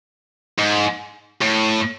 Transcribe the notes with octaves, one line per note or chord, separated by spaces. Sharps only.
G#2
A2